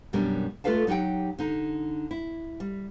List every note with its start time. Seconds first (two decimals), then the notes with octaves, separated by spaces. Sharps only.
0.13 F#2 B2 G3 C#4 D4 A#4
0.64 A3 F4 A4 B4 F5 A5
0.87 F#3 D#4 G4 F#5 G5
1.39 D3 D#4
2.11 E4
2.60 G3